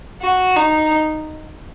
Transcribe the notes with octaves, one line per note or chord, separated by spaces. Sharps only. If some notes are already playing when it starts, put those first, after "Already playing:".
F#4
D#4